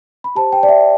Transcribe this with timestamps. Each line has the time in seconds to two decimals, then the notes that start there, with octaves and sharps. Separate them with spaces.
0.24 B5
0.36 G4 C5 A5
0.53 G5
0.63 D5
0.69 E5